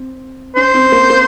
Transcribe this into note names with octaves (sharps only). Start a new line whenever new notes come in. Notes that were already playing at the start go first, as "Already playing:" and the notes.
Already playing: C4
C#4 C5
C4
A#3
A#3